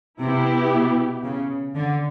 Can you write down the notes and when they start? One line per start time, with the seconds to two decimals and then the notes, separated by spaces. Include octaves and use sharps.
0.20 C3 B3 E4 G4
0.71 B2
1.23 C#3
1.75 D3